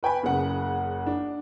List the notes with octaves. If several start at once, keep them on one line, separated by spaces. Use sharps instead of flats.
B4 G5 G#5 B5
F#1 C#3 F#5
D4